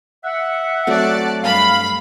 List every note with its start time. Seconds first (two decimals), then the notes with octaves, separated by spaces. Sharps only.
0.24 E5 F#5
0.87 F#3 A3 C4 D5 A5
1.43 G2 F5 B5